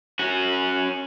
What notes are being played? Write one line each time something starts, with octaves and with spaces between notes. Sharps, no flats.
C#4 F#4